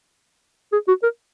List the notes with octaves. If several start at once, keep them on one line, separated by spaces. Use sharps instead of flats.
G#4
F#4
A#4